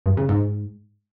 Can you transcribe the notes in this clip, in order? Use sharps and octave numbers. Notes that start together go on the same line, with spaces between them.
G2
C#3
G#2